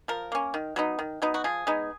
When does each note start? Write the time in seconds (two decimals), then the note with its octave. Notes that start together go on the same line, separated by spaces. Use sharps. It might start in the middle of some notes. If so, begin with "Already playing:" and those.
0.08 F3 A#4
0.32 A#3 C#4
0.54 D#3
0.76 F#3 B3 D#4
0.99 D#3
1.22 F#3 B3 D#4
1.34 F#4
1.44 F3 G#4
1.67 G#3 B3 D#4